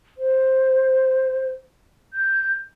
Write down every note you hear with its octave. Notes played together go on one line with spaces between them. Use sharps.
C5
G6